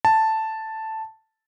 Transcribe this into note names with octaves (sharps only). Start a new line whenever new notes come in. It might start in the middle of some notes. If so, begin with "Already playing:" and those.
A5